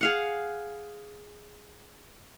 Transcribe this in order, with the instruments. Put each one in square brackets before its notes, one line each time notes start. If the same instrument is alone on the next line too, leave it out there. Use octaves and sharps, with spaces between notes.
[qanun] G#4 F5 F#5